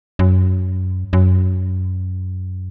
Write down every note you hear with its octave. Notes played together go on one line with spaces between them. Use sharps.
F#2
F#2